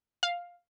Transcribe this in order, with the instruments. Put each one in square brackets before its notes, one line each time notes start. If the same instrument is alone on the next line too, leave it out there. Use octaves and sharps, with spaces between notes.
[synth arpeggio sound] F5